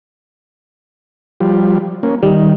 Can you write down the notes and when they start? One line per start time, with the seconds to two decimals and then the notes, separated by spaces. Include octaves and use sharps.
1.40 F3 G3
2.03 A#3 C#4
2.23 D#3 G3